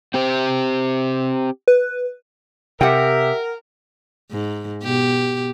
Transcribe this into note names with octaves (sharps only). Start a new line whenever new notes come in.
C4 G4 C5
B4
C3 G4 A#4 E5 F#5 G5
G#2
B2 G4